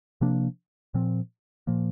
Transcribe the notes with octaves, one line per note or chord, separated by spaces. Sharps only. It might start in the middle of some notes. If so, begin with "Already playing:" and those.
C3 F3 A#3 D4
A#2 F3 C4
A#2 F3 A#3